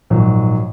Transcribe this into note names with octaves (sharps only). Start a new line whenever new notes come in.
A#1 G#2 F#3